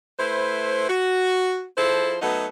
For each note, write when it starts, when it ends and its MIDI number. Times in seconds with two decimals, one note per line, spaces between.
0.19 0.87 57
0.19 0.87 64
0.19 0.87 71
0.19 0.87 72
0.89 1.64 66
1.78 2.17 53
1.78 2.17 64
1.78 2.17 68
1.78 2.17 69
1.78 2.17 72
2.22 2.47 54
2.22 2.47 57
2.22 2.47 59
2.22 2.47 63
2.22 2.47 66
2.22 2.47 69